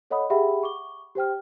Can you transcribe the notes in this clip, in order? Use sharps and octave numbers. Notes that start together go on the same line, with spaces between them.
A4 C#5 D#5 F#5 B5 D#6
G4 G#4 E5 F#5 G5 B5
C#6 D6 G7
G4 C5 G5 F6